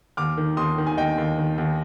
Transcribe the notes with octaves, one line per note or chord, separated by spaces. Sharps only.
D#2 D6 F6
D#3
D#2 C6 D#6
D#3
G#5
D#2 D#5 G5
D#2
D#3
D#2